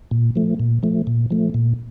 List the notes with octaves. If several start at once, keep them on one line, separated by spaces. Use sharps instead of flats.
A#2
F3 A3
A#2
F3 A3
A#2
F3 A3
A#2